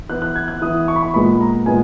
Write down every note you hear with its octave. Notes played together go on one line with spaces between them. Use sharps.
E3 B3 F#6
F#6
G#6
F#6
E3 B3 D#6
C#6
B5
C#6
A#2 G#3 B3 B5
A#5
A#2 G#3 B3 G#5